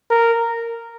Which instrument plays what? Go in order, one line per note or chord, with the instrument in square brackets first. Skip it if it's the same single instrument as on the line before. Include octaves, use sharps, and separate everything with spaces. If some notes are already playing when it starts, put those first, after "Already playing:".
[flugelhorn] A#4